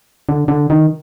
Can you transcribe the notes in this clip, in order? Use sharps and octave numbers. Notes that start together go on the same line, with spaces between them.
D3
D3
D#3